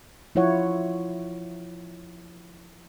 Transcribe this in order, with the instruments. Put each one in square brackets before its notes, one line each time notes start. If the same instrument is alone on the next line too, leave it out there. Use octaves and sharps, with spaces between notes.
[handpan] F3 E4 F4 C#5 F#5